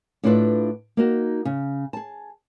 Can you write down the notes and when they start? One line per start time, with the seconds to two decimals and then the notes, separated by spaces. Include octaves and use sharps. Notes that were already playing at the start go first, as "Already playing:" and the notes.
0.24 A2 D4 E4 F4 B4 E5
0.97 A#3 D#4 F#4
1.45 C#3
1.93 G#4 A5